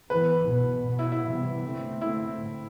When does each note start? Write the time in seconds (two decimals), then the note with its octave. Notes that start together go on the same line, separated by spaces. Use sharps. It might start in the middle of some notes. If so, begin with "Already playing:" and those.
0.10 E3 B3 B4
0.48 B2 B3
0.86 B2 B3
0.99 E4
1.12 E4
1.24 C3 E3 G3 B3
1.63 D3 A3 C4
2.01 D3 A3 C4 E4
2.39 A2